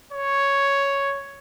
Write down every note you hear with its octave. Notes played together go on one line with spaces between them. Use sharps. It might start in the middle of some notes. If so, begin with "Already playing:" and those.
C#5